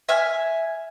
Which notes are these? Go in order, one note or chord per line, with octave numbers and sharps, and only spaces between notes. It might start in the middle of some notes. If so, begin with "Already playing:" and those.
E5 G#5 F6